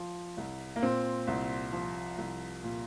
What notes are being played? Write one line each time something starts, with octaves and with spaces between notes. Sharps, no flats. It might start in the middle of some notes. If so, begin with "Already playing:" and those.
Already playing: F3
C2
A#3
A#2 C4
C2
F3
C2
A#2